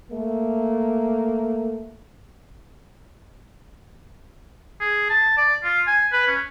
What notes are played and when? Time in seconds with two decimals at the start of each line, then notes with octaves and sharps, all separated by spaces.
0.12 A3 A#3
4.81 G#4
5.10 A5
5.38 D5
5.64 F4
5.87 G#5
6.12 B4
6.28 C#4